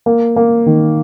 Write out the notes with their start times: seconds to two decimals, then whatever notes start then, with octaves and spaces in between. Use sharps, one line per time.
0.06 A#3
0.36 A#3
0.66 D#3